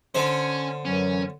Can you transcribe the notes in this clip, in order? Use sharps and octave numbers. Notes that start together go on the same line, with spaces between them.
D3 C#4 C5
F#2 E3 F#3 C#4